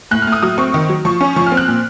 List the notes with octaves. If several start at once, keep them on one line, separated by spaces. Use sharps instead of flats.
A2 F#6
F6
A2
D#6
F#3 D#6
C4 C#6
D#3
F#3
F3 C#6
C#4
F3 C#6
F6
C4
F#6
A#2